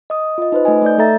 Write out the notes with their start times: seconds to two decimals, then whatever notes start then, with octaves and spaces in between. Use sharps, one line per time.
0.10 D#5 D#6
0.38 F4 D#5
0.52 D#4 B4 C5
0.65 A3 D#4 D#5 G#5
0.82 A3 D5 G6
0.98 A3 A4 E5 A#5 A6